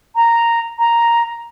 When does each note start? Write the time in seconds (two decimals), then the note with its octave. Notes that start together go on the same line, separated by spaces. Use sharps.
0.15 A#5
0.79 A#5